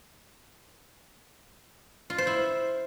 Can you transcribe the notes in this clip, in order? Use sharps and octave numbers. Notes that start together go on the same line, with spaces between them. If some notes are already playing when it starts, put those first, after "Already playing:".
F4
C5
E4